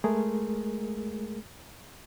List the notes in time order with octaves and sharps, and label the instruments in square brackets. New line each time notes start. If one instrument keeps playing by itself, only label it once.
[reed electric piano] G#3 A3 G#4 A#4